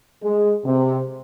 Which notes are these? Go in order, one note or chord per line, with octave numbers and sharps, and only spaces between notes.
G#3
C3